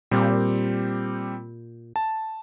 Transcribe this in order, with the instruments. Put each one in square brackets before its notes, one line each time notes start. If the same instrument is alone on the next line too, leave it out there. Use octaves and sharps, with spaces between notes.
[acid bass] A#2 [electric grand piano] G3 C4 G4
[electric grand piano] A5